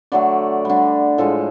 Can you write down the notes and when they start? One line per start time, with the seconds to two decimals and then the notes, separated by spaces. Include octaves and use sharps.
0.12 D3 F#3 A3 D5
0.65 D3 G3
1.18 A2 F3 G#3 A4